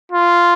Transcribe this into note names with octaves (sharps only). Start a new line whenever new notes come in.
F4